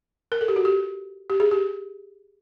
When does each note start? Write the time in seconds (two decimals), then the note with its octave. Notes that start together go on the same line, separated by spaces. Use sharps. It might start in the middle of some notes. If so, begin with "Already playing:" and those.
0.32 A#4
0.41 A4
0.48 G4
0.56 F#4
0.65 G4
1.30 G4
1.40 G#4
1.51 G4